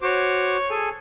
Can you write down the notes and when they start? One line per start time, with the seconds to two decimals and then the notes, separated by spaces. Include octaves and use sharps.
0.02 F#4 C5 C#5 D6
0.70 G#4 A4 G#5